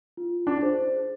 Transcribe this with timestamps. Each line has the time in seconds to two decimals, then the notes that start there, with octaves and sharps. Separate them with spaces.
0.17 F4
0.47 D4
0.62 G#4 C5